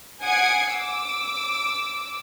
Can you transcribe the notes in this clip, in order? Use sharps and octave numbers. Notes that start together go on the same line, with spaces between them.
F#5 G#5 D#6 G#6 C7 D7
D6 E6